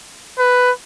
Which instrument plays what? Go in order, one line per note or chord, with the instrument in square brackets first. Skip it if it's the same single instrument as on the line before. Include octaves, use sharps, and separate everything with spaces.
[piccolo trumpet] B4